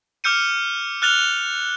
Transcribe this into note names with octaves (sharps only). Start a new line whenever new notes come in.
D6 E6 F6 G6 C#7 D#7
F6 F#6 A6 F7 G7